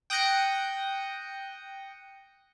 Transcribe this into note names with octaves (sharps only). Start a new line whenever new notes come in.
G5 D#6 F#6 G6 A#6 C#7